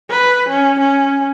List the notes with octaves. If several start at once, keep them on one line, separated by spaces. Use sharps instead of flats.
B4
C#4
C#4